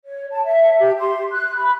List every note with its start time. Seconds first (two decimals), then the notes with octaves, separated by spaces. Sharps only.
0.04 C#5
0.31 A5
0.45 E5
0.79 G4
0.99 C6
1.31 F#6
1.56 B5